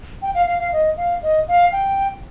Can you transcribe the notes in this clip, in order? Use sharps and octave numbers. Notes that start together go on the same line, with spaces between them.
G5
F5
F5
F5
D#5
F5
D#5
F5
G5